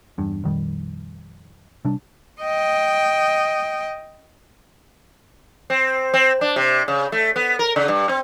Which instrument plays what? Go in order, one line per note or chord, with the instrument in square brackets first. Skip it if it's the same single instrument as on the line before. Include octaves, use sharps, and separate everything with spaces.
[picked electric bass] E2 G2
A#1 F2 D#3 G3
C3 G3 D4
[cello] D#5 G5
[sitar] C4
C4
D4
C3
C#3
A3
B3
A#4
C#3
G2
C4